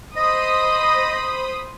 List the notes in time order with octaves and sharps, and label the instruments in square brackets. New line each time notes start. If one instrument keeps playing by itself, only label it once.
[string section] C5 B5 D#6 [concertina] D#5